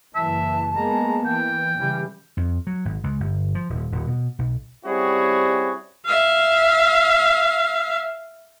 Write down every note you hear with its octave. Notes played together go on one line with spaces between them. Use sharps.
F#1 E3 E5 A5
G#3 A#3 B3 A#5
E3 G5
C#3 E3 G3
F2
F#3
G#1
C#2
G1
F3
D#1
D#1
B2
B1
G3 C4 C#4 E4 F#4 G#4
E5 F5